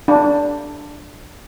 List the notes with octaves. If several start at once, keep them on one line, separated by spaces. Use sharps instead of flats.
D4